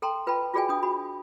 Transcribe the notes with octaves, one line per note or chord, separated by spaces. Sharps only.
A4 G5 A#5 C6
F4 B4 F5 G5 A5 B5
F4 F#4 G#4 D5 G5 G#5
D4 G5 D#6
F#4 B5